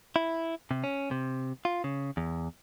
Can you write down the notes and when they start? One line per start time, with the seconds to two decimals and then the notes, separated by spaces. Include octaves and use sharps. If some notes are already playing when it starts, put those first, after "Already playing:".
0.16 E4
0.71 C3
0.84 C#4
1.11 C3
1.65 F4
1.84 C#3
2.17 E2